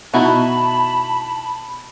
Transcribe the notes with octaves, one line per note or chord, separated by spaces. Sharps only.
B2 D#4 E4 F#4 A5 B5